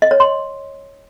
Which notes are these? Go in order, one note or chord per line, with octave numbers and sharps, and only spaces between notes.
D#5
C#5
C6